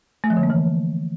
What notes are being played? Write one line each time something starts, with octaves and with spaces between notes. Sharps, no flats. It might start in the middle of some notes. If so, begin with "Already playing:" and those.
A3
F3
D3
A#3
E3